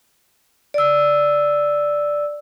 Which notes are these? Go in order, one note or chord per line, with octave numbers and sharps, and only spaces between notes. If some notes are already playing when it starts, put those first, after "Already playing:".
D5 E6